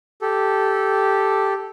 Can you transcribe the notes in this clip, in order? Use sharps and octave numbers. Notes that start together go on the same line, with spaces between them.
G4 A4